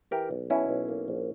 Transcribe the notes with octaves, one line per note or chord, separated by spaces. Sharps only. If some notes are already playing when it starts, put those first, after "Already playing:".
E3 G4 A#4
B1
B2 C#4 E4
B1
A#3
A#1